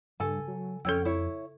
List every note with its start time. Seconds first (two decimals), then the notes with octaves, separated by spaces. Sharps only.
0.20 G2 C#3 A4 G#5
0.48 F#3
0.85 F2 C#4 A4 C#5 G5 E6
1.05 E4 C#5